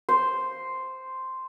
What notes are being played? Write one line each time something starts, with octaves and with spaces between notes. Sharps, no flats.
C5